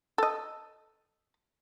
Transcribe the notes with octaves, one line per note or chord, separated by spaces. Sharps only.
A4 D#5